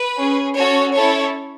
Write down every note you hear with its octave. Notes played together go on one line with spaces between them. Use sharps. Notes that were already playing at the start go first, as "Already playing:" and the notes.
Already playing: B4
C#4 G#4
C#4 F#4 A4 C#5
C#4 E4 A4 C#5